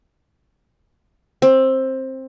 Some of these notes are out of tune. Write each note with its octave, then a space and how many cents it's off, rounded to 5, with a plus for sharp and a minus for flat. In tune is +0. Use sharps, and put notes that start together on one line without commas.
C4 +15